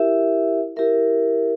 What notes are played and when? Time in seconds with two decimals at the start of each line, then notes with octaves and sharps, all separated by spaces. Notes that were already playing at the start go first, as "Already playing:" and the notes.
Already playing: E4 G4 A#4 E5
0.76 E4 G4 A#4 E5